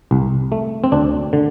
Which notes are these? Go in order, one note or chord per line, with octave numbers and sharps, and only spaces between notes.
C2
A3
C4
D2 D4
D3